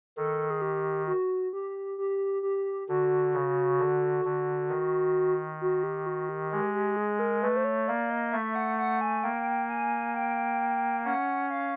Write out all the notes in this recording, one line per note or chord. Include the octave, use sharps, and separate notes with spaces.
D#3 A4
G#4
G4
F#4
G4
G4
G4
D3 F#4
C#3
D3
D3
D#3
F#4
G4
F#4
G4
G#3 G4
G4
G#4
A#4
A3 B4
C5
C#5
A#3 D5
D#5
A3 E5
F#5
F#5
G#5
A#3 G5
G#5
G5
C#4 F#5
F5